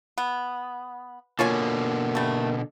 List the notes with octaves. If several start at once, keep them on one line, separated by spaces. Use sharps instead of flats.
B3
B2 D3 A#3 F4 C#5 G#5
G3 A3